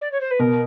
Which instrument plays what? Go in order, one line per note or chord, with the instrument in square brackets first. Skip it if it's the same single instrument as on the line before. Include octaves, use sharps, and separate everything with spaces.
[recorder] D5
C#5
C5
B4
[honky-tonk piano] B2 [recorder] A#4